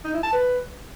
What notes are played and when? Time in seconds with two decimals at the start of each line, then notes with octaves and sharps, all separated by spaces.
0.04 D#4
0.14 E4
0.23 A5
0.32 B4